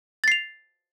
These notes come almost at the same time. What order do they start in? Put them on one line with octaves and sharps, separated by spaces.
A6 C7 F7